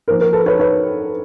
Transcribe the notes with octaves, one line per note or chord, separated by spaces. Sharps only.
F3 A#3 D#4 A#4 C5
A#4
A4 B4
B4 C#5
B4 C#5